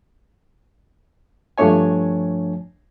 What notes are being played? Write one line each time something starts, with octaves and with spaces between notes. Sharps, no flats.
G2 F3 A3 D4 C#5 G#5